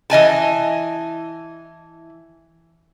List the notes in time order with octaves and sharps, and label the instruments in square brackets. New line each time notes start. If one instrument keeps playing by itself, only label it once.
[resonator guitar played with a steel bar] E3 D#5 G#5 A5